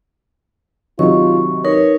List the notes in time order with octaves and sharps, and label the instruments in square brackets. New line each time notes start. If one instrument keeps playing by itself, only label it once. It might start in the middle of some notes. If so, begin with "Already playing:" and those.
[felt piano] C3 D#3 F#3 [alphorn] F4 [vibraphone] C#6
[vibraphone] D#4 A#4 B4 [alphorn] C#5